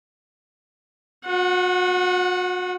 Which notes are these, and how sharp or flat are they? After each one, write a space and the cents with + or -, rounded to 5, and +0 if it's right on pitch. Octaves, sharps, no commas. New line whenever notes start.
F#4 -40 F#5 +0